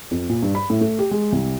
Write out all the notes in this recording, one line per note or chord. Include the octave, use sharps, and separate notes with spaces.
F2
A#2
G2
B5
A2
A3
G4
G#3
C2